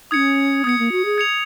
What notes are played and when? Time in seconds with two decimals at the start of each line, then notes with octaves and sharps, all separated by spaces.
0.11 C#4 D#4 D#6 G#6 C#7
0.64 B3 D#6 G#6 C#7
0.79 A#3
0.92 F#4
1.05 G#4
1.18 G#6 C#7 F7